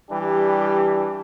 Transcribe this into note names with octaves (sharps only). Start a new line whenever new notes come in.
E3 G3 D4 G4